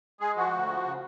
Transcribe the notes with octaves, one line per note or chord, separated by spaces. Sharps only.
G#3 G#4
F3 F#4
D2
F3
C#3